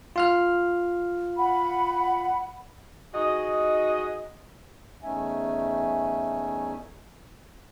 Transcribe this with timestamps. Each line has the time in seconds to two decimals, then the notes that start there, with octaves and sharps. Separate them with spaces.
0.16 F4 F5 F6
1.37 F#5 B5
3.14 D#4 F#4 G#4 D#5
5.03 E2 A3 C#4 D#4 E5 G#5